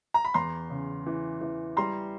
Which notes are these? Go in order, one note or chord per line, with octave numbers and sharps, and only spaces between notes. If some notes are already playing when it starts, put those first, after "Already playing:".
A#5
B5
E2 A#5 C6
C#3
E3
E3
G3 A#5 C6